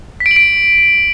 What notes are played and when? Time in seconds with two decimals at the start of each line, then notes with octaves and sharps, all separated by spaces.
0.20 B6
0.26 D7
0.31 F#7
0.36 D7